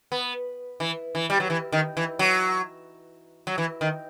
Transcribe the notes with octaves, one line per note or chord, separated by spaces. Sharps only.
B3
E3
E3
G3
F#3
E3
D#3
E3
F#3
F#3
E3
D#3